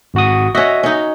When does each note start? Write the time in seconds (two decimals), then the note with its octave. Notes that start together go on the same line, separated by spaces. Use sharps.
0.14 G#1 F#4 D#6
0.55 C#4 F#4 D#5 E5
0.83 C#4 D#4